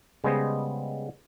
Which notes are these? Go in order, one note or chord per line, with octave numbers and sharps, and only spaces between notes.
C#3 G3 G#3 B3 C5 D#5